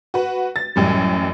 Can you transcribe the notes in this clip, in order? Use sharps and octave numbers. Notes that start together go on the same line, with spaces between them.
F#4 B4
A6
A1 F#2 G3